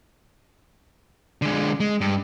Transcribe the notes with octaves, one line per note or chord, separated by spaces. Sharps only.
D3 G#3
G#3
G2